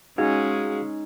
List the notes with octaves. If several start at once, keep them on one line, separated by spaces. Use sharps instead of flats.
G#3 C#4 D#4 F#4 G#4 F5